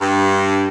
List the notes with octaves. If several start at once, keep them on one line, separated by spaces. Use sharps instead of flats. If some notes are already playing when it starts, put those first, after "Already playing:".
G2